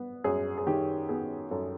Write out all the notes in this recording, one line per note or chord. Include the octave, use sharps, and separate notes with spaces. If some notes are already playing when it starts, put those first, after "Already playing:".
Already playing: B3
F#2 G#4
G#4
D#3 G4
B3 G#4
F#2 A4